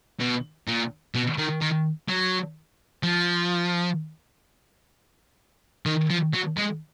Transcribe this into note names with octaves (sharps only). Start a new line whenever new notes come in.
B2
A#2
B2
D#3
D#3
F#3
F3
D#3
F3
F#3
G#3